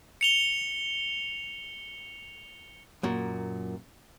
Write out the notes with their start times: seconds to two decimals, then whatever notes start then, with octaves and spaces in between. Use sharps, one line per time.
0.21 C#7 F7 G7
3.03 F#2 A#2